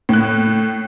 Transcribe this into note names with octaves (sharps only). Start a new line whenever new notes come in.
A2 F#6